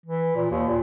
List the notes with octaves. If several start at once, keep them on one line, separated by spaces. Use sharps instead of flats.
E3
A#2
D#2
A#2